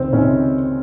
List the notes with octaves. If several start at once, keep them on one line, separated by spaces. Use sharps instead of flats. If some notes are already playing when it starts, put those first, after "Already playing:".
Already playing: C#2 C3 D#3 C4
C#2 C3 D#3 C#4